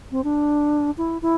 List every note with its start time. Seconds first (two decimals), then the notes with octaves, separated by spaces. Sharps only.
0.11 C4
0.24 D4
0.98 E4
1.22 E4